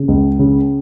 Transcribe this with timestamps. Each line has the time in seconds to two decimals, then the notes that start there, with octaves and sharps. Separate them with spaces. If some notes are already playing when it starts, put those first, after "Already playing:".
Already playing: C#3
0.08 C#2
0.39 C#3